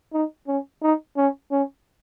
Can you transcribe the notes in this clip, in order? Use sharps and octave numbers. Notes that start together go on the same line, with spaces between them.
D#4
C#4
D#4
C#4
C#4